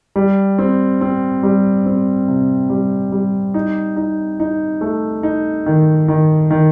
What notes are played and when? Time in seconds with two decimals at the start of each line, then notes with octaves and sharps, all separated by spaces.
0.16 G3
0.59 C4
1.01 C4
1.43 G3
1.86 C4
2.28 C3
2.70 G3
3.12 G3
3.54 D#4
3.96 D#4
4.40 D#4
4.81 A3
5.23 D#4
5.66 D#3
6.08 D#3
6.51 D#3